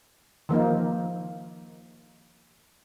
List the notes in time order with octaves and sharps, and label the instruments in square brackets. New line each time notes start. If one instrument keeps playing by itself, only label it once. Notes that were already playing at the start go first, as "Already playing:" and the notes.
[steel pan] D#3 F3 A#3 D#4